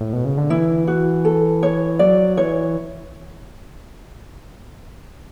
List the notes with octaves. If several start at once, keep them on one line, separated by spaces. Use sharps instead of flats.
A2
B2
C#3
D3
E3 E4
F#4
A4
C#5
F#3 D5
E3 C#5